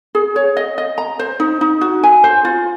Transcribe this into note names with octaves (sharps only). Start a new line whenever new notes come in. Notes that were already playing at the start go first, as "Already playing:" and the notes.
G#4
C#5
D#5
D#5
A#5
C5
D#4
D#4
F#4
G#5
C5
F4